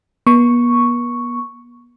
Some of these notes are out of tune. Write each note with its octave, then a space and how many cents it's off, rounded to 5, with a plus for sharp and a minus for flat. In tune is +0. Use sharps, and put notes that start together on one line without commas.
B3 -40 C#6 +0